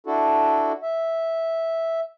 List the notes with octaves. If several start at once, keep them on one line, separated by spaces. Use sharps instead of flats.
D4 E4 F#4 A4
E5